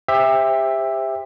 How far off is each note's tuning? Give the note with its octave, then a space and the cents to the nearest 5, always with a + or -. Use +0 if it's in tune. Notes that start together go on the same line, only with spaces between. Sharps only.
G4 +30 C5 +0 E5 +0